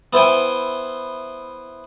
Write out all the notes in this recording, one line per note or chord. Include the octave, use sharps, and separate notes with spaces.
B3 E4 C5 E5 G5 G#5